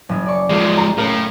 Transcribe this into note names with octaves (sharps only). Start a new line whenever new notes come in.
F#1 C#3
D5 C#6
F3 G#3
A#5
A2 C#3 A#4